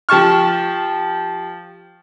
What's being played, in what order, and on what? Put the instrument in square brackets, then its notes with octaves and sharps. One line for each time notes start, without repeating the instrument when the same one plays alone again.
[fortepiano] F3 G4 A5 C#6 F6